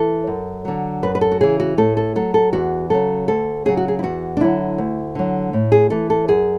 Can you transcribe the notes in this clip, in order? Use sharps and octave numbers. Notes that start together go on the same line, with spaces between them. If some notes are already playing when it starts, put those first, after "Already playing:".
Already playing: E3 A4
F#2
D3 F#3
F#2 B4
B4
A4
F#4
C#3 E3 G#4
F#4
A2 A4
A4
F#3 A4
A4
E2 F#4
C#3 F#3 A4
D2 A4
C#3 F#3 G#4
F#4
G#4
E4
E2 F#4
D4
D3 F#3 E4
D2
D3 F#3
A2
G#4
E3 A4
A4
F#2 G#4